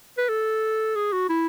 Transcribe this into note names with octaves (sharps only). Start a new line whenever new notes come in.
B4
A4
G#4
F#4
E4